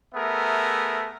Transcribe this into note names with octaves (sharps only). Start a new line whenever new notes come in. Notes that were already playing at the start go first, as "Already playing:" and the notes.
A3 B3 G#4 A#4 E5